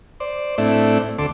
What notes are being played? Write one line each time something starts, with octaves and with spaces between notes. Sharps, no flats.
C5 D5
A2 A3 C4 D4 E4
D2 D3 A4 C6 D6